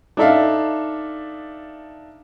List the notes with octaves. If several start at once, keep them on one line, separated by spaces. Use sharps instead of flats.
D4 D#4 A4 E5 F5